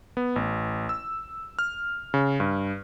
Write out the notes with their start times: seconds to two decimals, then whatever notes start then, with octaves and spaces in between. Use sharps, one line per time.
0.17 B3
0.36 A1
0.89 E6
1.59 F6
2.14 C#3
2.40 G2